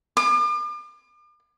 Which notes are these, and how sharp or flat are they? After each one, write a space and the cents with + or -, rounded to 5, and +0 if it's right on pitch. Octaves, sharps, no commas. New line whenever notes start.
D6 +40